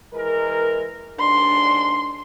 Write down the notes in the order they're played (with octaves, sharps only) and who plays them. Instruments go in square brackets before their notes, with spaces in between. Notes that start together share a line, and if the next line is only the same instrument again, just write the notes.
[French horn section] E3 G#3 A#4
[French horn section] D#2 G#2 D4 [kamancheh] C6